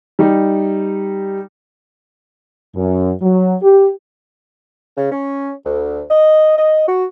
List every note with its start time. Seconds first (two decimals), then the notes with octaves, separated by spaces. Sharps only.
0.19 G3 D#4
2.75 F#2
3.22 F#3
3.62 G4
4.97 C#3
5.11 C#4
5.65 D2
6.10 D#5
6.57 D#5
6.88 F#4